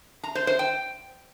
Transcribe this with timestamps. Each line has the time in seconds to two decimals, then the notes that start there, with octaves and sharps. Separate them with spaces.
0.24 A#5
0.35 C5
0.47 C5
0.59 G5